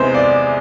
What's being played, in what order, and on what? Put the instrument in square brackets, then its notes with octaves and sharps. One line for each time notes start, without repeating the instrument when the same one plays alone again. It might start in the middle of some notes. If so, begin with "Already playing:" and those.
Already playing: [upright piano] E2 C3 E3 G#3 B3 [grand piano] C5
[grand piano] D5